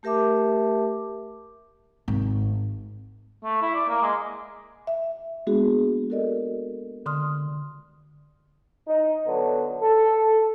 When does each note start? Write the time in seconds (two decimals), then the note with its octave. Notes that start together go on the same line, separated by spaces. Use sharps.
0.03 A3 G4 A#4 E5 A5 D6
2.08 G#1
3.44 A3
3.62 E4
3.75 D5
3.88 A#3
4.02 G#3
4.87 E5
5.47 G#3 A#3 B3 D4 F#4 G#4
6.10 F#4 A4 A#4 D5 D#5
7.06 D3 C6 D#6 F6
8.88 D#4
9.27 D3 F#3 B3
9.81 A4